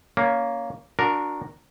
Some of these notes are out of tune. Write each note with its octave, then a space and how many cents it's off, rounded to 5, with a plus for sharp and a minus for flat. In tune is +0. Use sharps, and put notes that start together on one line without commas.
A#3 +0 C#4 +15
D4 +0 F#4 -25 A#4 +0